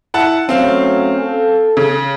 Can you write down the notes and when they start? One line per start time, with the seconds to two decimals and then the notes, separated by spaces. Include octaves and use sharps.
0.14 E4 F#5 A5
0.49 F#3 A3 C4 C#4 F5
1.21 A4
1.77 C#3